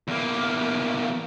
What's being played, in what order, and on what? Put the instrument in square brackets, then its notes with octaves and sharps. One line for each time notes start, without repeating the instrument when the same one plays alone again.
[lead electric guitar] E2 A#3